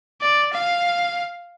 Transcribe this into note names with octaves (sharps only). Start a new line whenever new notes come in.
D5
F5